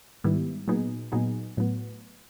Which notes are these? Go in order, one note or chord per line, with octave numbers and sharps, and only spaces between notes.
G#2 D#3 G3 B3 E4
A#2 F#3 B3 D#4 G#4
A#2 F#3 B3 D#4 G#4
A2 F#3 B3